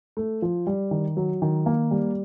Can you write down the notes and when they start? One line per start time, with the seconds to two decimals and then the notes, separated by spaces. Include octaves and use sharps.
0.17 A3
0.42 F3
0.67 G3
0.91 D#3
1.17 F#3
1.42 D#3
1.66 A#3
1.91 G3